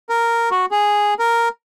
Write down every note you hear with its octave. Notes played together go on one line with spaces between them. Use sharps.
A#4
F#4
G#4
A#4